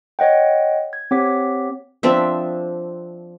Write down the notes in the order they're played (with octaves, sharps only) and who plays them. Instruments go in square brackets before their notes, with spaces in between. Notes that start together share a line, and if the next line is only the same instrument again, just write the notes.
[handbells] C#5 D#5 F#5 G5
G#6
C4 G4 C#5 F#5 D6 B6
[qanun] F3 C4 D4 E5